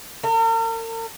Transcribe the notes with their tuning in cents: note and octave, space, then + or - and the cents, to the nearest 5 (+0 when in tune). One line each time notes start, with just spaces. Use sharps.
A#4 -45